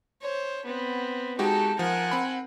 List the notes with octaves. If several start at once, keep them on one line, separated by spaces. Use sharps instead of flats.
C5 C#5
B3 C4
G#3 D#4 F#4 G4 A4
F3 A#4 F#5 G#5
C4 B5